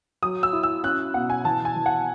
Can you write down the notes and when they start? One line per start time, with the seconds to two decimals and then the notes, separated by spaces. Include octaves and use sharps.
0.22 F#3 D#6
0.43 E6
0.53 E4
0.63 E6
0.84 C#4 F#6
1.14 B2 F#5
1.30 G#5
1.45 E3 A5
1.65 G#5
1.76 E3
1.86 F#5